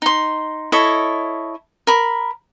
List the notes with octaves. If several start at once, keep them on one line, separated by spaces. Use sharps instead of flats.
D#4 C6
E4 A4 C#5 D#5
A#4 B5